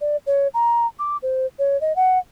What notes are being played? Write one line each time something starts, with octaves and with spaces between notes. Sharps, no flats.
D5
C#5
A#5
D6
C5
C#5
D#5
F#5